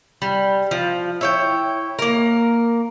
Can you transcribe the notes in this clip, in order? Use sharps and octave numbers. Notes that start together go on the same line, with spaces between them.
G3
F3
E4 C#5 G5
A#3 A#4